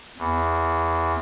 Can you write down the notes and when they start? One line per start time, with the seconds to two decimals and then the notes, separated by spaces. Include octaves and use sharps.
0.18 E2